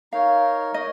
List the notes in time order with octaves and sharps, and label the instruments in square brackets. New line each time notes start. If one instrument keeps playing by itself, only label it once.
[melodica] D#4 A#4 C#5 [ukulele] F5
[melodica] A#4 C#5 [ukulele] D#5